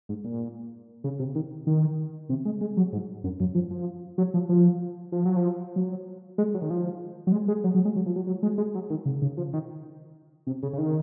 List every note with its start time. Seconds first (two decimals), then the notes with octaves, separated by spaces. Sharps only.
0.09 G#2
0.24 A#2
1.04 C#3
1.19 C3
1.35 D#3
1.67 D#3
2.29 C3
2.45 G#3
2.61 G#3
2.77 F#3
2.93 G#2
3.24 F#2
3.40 F#2
3.55 F3
3.71 F3
4.18 F#3
4.34 F3
4.49 F3
5.12 F3
5.25 F#3
5.36 F3
5.76 F#3
6.38 G#3
6.54 F#3
6.61 D#3
6.70 F3
7.27 F#3
7.32 G#3
7.48 G#3
7.64 F#3
7.74 F#3
7.85 G#3
7.96 F#3
8.06 F3
8.16 F#3
8.27 F#3
8.43 G#3
8.58 G#3
8.75 F#3
8.90 D#3
9.05 C#3
9.22 C#3
9.37 F3
9.53 D#3
10.47 C3
10.63 C#3
10.73 C#3
10.78 D#3